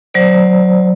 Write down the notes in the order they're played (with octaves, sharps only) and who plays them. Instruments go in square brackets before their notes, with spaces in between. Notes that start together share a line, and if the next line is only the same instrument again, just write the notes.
[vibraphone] F#3 C5 D5